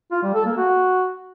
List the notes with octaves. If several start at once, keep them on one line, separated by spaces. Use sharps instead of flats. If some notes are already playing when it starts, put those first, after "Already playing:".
F4
G3
A4
A#3
F#4